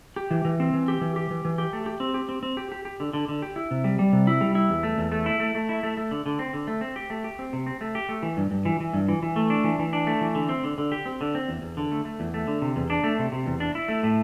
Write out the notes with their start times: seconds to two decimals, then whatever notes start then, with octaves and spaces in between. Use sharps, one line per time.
0.16 G4
0.31 E3
0.45 E3
0.60 C4
0.74 E3
0.88 G4
1.01 E3
1.16 G4
1.31 E3
1.45 E3
1.58 G4
1.73 A3
1.86 G4
2.00 C4
2.14 G4
2.29 C4
2.43 C4
2.57 G4
2.72 G4
2.85 G4
3.00 D3
3.13 D3
3.29 D3
3.42 G4
3.56 E4
3.71 C3
3.84 G3
3.99 G3
4.13 C3
4.27 E4
4.41 G3
4.55 E4
4.70 E2
4.83 A3
4.98 E2
5.12 A3
5.26 E4
5.40 A3
5.55 A3
5.69 E4
5.83 A3
5.97 A3
6.11 D3
6.26 D3
6.39 C4
6.54 D3
6.67 A3
6.81 C4
6.96 G4
7.10 A3
7.24 G4
7.39 C4
7.53 C3
7.67 C4
7.81 A3
7.95 G4
8.09 A3
8.23 E3
8.37 G2
8.51 G2
8.65 E3
8.80 E3
8.93 G2
9.08 E3
9.23 E3
9.36 A3
9.50 D4
9.64 E3
9.79 E3
9.93 D4
10.07 A3
10.21 E3
10.35 D3
10.49 C4
10.64 D3
10.78 D3
10.92 G4
11.06 C4
11.21 D3
11.35 C4
11.48 E2
11.62 E2
11.77 D3
11.92 A3
12.05 A3
12.20 E2
12.34 A3
12.47 D3
12.62 C3
12.76 E2
12.90 D4
13.04 A3
13.19 C3
13.32 C3
13.46 E2
13.60 D4
13.75 E4
13.88 A3
14.03 A2